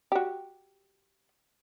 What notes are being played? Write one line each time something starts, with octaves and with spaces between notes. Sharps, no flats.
F#4 G4